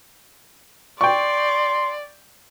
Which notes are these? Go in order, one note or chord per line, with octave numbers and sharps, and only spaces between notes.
D5 G5 C6 C#6